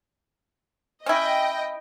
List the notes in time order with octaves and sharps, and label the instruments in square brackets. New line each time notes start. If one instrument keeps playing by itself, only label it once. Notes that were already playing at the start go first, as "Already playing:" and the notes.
[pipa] C#4 E4 [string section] D#5 G5